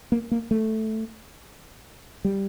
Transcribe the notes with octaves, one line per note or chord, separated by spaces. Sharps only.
A#3
A#3
A3
G3